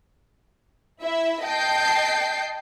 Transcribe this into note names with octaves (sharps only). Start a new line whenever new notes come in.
E4 E5
D#5 G5 A5 G6 C7